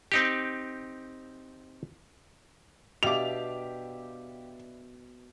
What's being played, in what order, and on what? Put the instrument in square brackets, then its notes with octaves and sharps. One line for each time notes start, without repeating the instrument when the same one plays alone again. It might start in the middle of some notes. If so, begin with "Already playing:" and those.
[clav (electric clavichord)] C4 D#4 G4
[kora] B2 [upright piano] B3 D4 E5 [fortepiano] G4 F5 D6 [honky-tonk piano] F7